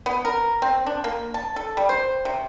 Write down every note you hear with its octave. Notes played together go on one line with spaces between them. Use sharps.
B3
A#4
C4
D4
A#3
A5
A4
G3
C5
C3